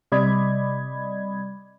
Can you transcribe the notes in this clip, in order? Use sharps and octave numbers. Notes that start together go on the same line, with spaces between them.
C3 G3 D5 D#5 B5 G#6